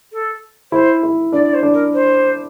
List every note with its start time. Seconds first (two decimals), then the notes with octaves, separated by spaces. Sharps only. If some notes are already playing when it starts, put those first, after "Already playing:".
0.12 A4
0.72 E4 C5
1.03 E4
1.32 D4 D5
1.44 D5
1.53 C5
1.63 D4
1.73 A#4
1.93 C5